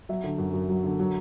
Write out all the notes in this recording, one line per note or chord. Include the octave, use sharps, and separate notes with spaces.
F#3 E5
D3
F#2
F#2
F#3
D3
F#3